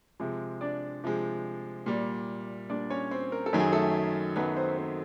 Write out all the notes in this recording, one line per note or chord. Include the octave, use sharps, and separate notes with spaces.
C3 F3 G#3
D4 D5
C3 F3 G#3
A#2 G3
A#2 G3 D4 D5
C#4 C#5
C4 C5
A#4
A4
F#2 D#3 F#3
G#4
A3 A4
F#2 D#3 F#3 B3 B4
C4 C5
C4 C5